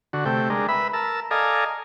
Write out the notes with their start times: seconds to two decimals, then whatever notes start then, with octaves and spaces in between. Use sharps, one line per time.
0.13 D3 F#4
0.25 C3 A3 G5
0.50 G#3 D4 A#4
0.69 B4 E5 B5
0.93 A#4 A5 E6
1.31 A4 D5 D#5 F5 G#5 A#5